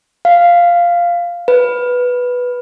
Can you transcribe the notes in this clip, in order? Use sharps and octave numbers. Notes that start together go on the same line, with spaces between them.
F5
B4